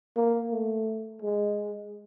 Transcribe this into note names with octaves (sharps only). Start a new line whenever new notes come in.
A#3
A3
G#3